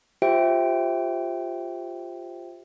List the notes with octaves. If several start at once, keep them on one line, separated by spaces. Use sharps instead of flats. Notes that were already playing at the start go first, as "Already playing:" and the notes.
F4 G4 C5 E5 G5 D7